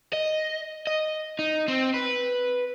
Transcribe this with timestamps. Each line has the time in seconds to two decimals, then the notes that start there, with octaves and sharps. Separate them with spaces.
0.13 D#5
0.87 D#5
1.39 D#4
1.68 C4
1.94 B4